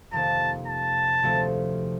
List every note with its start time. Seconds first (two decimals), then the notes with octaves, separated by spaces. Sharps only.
0.11 F2 C3 D#3 A#3 A5
0.67 A5
1.23 D2 C3 F3 A3 C4